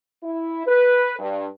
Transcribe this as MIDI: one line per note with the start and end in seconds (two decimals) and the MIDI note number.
0.24 0.65 64
0.66 1.15 71
1.19 1.46 43